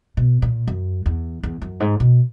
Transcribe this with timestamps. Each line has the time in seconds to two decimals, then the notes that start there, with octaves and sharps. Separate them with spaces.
0.17 B2
0.42 A#2
0.68 F#2
1.06 E2
1.43 E2
1.62 F#2
1.80 G#2
2.00 B2